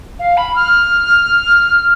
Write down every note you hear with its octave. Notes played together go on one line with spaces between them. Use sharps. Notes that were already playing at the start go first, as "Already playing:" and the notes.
F5
B5
F6